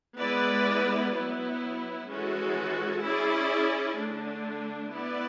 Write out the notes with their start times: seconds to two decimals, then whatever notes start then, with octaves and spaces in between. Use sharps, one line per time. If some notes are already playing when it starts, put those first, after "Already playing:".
0.19 G#3 B3 E4 B4 D5
1.14 F#3 B3 E4
2.09 E3 G#3 C#4 F#4 A4
3.04 C#4 E4 G#4 D5
3.99 D3 A3 D4
4.93 B3 E4 B4 D5